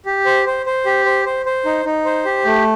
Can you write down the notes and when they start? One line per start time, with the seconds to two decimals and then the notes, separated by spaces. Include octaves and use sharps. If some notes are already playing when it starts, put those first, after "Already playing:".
0.06 G4
0.26 C5
0.46 C5
0.66 C5
0.86 G4
1.05 C5
1.26 C5
1.46 C5
1.65 D#4
1.85 D#4
2.05 C5
2.25 G4
2.45 A3